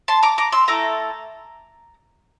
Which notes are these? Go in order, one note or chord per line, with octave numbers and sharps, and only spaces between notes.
A5 C6
A#5 D6
A#5 D6
C6 E6
A3 E4 A4 A#5 D6